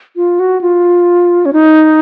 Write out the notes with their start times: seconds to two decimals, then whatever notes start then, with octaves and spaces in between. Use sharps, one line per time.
0.16 F4
0.40 F#4
0.61 F4
1.46 C#4
1.53 D#4